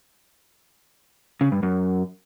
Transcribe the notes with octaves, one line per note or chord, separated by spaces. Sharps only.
C#3
G2
F#2